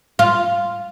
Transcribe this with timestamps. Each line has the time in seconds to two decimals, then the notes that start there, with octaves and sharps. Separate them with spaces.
0.19 F4